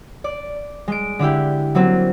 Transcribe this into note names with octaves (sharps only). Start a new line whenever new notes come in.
D5
G#3 D7
D3 D4 E4 G4
F#3 A#3 C4